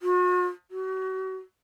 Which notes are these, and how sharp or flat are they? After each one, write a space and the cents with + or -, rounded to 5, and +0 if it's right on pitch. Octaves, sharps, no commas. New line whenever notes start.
F#4 -45
F#4 +35